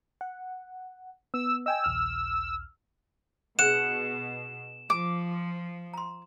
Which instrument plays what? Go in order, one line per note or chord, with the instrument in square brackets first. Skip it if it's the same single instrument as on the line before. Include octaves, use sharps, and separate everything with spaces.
[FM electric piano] F#5
[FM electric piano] B3 [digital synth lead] E6
[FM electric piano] D#5 G5 G#5 [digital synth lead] E6
[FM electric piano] A#1 D#2 F6
[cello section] B2 [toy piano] D4 G#4 [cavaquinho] F#5 [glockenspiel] E7
[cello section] F3 [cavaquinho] D6
[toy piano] A#5 C6